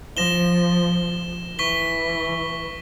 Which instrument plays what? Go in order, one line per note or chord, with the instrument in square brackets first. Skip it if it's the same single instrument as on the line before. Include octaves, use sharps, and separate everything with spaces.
[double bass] F3 [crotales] A#6 E7 G7
[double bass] E3 [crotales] C#6 B6 G7